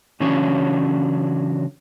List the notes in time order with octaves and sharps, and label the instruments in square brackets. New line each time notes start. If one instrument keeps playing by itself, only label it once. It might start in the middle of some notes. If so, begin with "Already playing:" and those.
[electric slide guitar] C#3 E3 F#3 C#4 D4 C#5